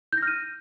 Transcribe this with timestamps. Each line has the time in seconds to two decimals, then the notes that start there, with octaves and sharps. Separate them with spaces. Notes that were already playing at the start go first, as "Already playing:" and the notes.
0.13 G6
0.18 A#6
0.22 F6
0.27 D#7